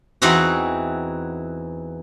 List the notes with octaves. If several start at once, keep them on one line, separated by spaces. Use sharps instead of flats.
E2 E3 C4 D#4 F#4